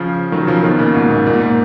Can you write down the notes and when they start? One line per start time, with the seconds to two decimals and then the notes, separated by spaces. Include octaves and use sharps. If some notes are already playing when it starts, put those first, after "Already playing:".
Already playing: C#3 F3
0.32 D#3 F#3
0.47 C#3 F3
0.63 B2 D#3
0.79 A#2 C#3
0.95 G#2 B2
1.11 A#2
1.27 A#2
1.34 G#2
1.42 A#2